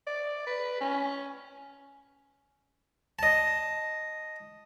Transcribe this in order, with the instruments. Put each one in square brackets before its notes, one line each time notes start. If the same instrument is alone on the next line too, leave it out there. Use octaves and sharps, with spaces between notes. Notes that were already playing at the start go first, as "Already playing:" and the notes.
[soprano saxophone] D5
B4
C#4
[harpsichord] D#5 A5